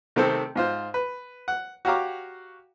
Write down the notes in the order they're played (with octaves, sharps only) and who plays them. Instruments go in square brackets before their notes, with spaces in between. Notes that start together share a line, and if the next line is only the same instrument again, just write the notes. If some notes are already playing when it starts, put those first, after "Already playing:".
[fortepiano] C3 D#3 A3 C4 A4 C5
G#2 F4 C5
B4
F#5
F#4 G4 C#5 F5 A#5 D6